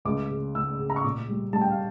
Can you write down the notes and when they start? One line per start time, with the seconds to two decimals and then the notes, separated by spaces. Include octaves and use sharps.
0.05 C#2 D6
0.30 C#3
0.55 C#2 E6
0.79 C#3
0.90 A#5
0.96 C#6
1.04 A#2 D6
1.29 G3
1.53 G3 A5
1.61 G5
1.70 F5